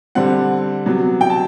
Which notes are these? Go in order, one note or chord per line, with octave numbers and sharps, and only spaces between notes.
D3 G3 C4 F#5
C3 F#3 B3
G5
A5